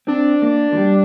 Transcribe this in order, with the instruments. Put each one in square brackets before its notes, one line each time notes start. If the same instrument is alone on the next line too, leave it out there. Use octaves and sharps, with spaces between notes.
[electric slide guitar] C4 [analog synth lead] D4
[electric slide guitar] A#3
F3
G3